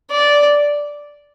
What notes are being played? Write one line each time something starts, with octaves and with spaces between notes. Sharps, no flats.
D5